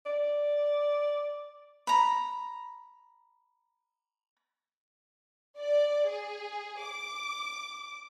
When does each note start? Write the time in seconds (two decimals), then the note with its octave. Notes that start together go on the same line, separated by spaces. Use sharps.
0.06 D5
1.87 A#5 B5
5.59 D5
6.07 G#4
6.83 D6